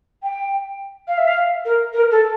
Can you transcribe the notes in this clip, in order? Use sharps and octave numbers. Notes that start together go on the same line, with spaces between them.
G5
F5
E5
F5
A#4
A#4
A4